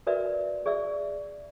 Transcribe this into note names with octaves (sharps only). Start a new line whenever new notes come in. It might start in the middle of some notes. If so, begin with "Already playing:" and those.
F#4 A#4 B4 D5 E5
G#4 D5 E5 E6